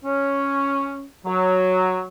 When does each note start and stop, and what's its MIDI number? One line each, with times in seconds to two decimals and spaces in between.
0.05 1.04 61
1.26 2.03 54